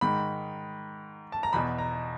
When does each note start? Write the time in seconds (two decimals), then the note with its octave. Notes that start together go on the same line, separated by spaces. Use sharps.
0.01 G#2 D#3 B5
1.32 A5
1.43 A#5
1.53 E2 B2 B5
1.78 A#5